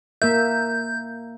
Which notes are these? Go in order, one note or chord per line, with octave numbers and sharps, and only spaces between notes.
A#3 A#4 E5 G6